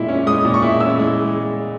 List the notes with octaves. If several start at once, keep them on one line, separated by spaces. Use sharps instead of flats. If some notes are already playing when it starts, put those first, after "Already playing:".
Already playing: A#2 G#3 E4
C#4
G#3 D#6
A#2
C#6
E4
C#4 E6
G#3